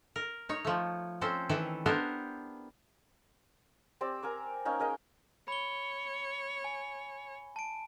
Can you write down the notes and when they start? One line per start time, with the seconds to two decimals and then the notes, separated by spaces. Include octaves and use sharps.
0.16 A#4
0.49 D#4 C#5
0.65 F3 A3
1.21 C4 C#4 A4 C5
1.49 D#3 E3 E4 A4
1.86 B3 D4 G4 A4 A#4 C5
4.01 C4 G4 C5 D5
4.22 A#4 G#5 A#5 D6
4.65 A#3 C#4 D#4
4.80 G#4 A#4 D#5 G5
5.48 C#5 B5 G7
6.64 G#5
7.56 A5 D7